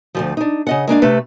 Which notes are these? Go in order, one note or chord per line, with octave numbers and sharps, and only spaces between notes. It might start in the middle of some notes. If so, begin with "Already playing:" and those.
D2 G#2 F3
D4 D#4
C#3 D#5 F#5
G#3 A#3 D4 F5
C3 A3 B4